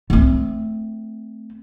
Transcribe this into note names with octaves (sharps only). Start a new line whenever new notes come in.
A3 C4